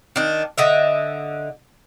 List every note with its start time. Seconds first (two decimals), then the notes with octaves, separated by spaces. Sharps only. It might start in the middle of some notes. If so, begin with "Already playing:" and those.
0.16 D#3 D4
0.58 D3 D#5 E5